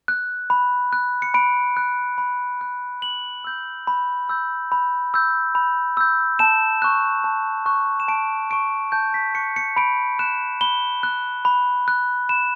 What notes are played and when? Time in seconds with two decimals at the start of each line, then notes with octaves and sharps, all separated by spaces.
0.08 F#6
0.50 B5
0.93 F#6
1.22 C#7
1.34 B5 D7
1.77 F#6
2.18 B5
2.61 F#6
3.02 B5 F#7
3.44 E6 G6
3.87 B5
4.29 E6 G6
4.72 B5
5.14 E6 G6
5.55 B5
5.97 E6 G6
6.39 A5 E7
6.82 C#6 F#6
7.24 A5
7.66 C#6 F#6
8.00 E7
8.08 A5 D7
8.50 C#6 F#6 D7
8.92 A5 G6
9.14 B6
9.35 C#6 F#6 C#7
9.56 C#7
9.76 B5 D7
10.19 F#6 E7
10.61 B5 G7
11.03 F#6
11.45 B5
11.88 F#6
12.29 B5 E7